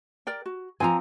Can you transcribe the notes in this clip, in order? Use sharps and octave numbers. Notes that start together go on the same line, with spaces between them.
A#4 D5 G5
F#4
F3 C4 G#5 A#5